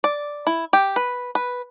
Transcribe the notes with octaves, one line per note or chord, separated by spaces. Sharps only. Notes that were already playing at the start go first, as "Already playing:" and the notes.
D5
E4
G4
B4
B4